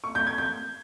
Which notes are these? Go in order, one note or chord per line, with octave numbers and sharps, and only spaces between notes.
C#6
G6
G#6
G6